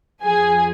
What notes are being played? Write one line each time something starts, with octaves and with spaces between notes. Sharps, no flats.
F2 F3 G#4 G#5